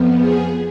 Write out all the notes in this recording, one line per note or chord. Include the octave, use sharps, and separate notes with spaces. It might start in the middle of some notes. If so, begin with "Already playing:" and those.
Already playing: F2 F3 B3
G#4